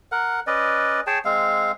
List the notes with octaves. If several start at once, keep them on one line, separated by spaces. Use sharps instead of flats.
A#4 F#5
C#4 B4 D5 D#5
G#4 C#5 G5 A5
G#3 C4 F5